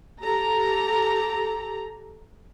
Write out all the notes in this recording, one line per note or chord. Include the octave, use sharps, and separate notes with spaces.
G4 A4 A#5